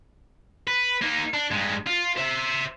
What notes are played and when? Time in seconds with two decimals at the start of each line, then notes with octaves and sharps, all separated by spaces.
0.68 B4
1.02 A#3 D#4
1.34 D4
1.51 G2 G#3
1.87 F4
2.17 C5 E5